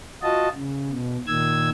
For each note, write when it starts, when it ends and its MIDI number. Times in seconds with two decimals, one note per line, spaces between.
0.22 0.49 65
0.22 0.49 66
0.22 0.49 75
0.22 0.49 81
0.55 0.91 49
0.92 1.18 47
1.27 1.70 46
1.27 1.70 51
1.27 1.70 88
1.27 1.70 92